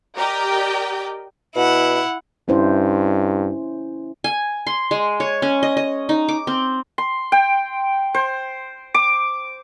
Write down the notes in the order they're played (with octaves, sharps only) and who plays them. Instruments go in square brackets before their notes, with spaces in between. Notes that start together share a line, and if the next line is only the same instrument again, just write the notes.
[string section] G4 A#4 D5 D#5 G5
[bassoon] B2 [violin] E4 F#5
[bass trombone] G2 [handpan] C#4 E4 C5
[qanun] G#5
C6
G#3
C#5
C#4
D#5
D#5
D#4
D6
C4
[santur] C6
G5
C5
D6